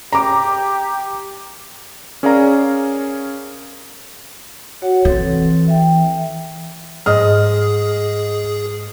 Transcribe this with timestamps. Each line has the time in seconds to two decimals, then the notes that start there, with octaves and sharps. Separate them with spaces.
0.13 G4 A#5 D6
2.23 C#4 G#4 A#4 D5 F5 A#5
4.82 F#4 C#5 F#5
5.05 E3 C4 A4
5.68 E5 G5
7.06 G#2 G#4 D#5 D#6 F6